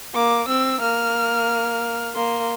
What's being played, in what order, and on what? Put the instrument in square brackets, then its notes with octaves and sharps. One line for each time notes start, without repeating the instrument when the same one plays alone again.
[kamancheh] A#3 [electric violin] D6
[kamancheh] C4 [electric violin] E6
[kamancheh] A#3 [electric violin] F6
[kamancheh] A#3 [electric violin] C6